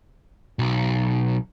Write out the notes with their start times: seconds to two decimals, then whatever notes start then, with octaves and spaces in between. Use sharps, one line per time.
0.59 B1